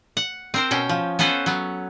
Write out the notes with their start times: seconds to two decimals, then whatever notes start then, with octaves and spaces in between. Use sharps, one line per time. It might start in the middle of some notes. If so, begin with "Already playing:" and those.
0.17 F#5
0.54 C4 A#4 C5
0.71 B2 C#4 G5
0.89 F3
1.19 B3 C#4 A4 B4 C5
1.46 F#3 B3